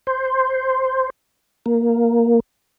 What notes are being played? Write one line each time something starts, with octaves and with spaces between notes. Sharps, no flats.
C5
A#3